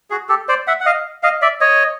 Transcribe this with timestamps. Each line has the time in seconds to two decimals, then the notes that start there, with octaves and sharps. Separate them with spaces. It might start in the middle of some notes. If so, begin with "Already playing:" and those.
0.10 F#4 G#4
0.29 G4 A4
0.49 C5 D5
0.67 E5 F#5
0.81 F#5
0.86 D#5 F5
1.23 D#5 F5
1.42 D5 E5
1.61 C#5 D#5